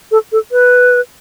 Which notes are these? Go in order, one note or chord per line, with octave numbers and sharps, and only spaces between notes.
A4
A4
B4